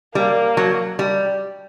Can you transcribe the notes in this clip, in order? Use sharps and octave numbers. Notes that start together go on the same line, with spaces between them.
G3 A#3
F#3
G3